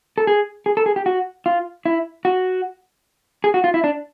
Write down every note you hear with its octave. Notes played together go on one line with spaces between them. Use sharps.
A4
G#4
G#4
A4
G#4
G4
F#4
F4
E4
F#4
G#4
F#4
F4
E4
D4